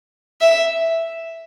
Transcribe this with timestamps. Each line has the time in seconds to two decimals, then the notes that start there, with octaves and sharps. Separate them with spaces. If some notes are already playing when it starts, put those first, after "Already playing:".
0.41 E5